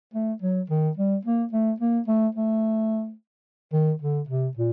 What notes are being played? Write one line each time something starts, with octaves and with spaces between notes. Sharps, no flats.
A3
F#3
D#3
G3
A#3
A3
A#3
A3
A3
D#3
D3
C3
A#2